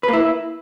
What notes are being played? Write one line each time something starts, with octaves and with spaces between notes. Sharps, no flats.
B4
A#3
E4